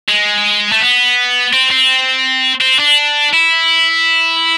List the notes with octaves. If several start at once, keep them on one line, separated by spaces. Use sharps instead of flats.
G#3
A3
B3
C4
C4
C4
D4
E4